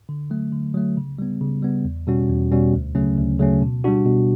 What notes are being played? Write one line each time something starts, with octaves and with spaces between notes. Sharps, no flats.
D3
F#3 A3
D3
F#3 A3
C#3
G3 B3
C#3
G3 B3
E2
B2 G3 C#4 F#4
E2
B2 G3 C#4 F#4
D2
C#3 F#3 A3 C#4
D2
C#3 F#3 A3 C#4
B2
G3 D4 F#4
B2